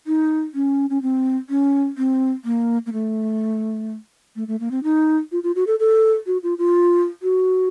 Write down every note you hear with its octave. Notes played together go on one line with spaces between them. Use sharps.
D#4
C#4
C#4
C4
C#4
C4
A#3
A#3
A3
A3
A3
A#3
C4
D#4
F4
F4
F#4
A4
A4
F#4
F4
F4
F#4